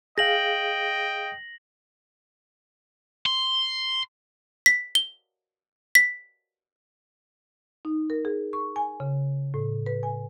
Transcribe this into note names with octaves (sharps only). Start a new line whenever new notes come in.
G#4 D#5 F5 G5 A#6 F#7
C6
B6
G7
B6
D#4
A#4
G#4
C#6
G#5
C#3
A2
B4
G#5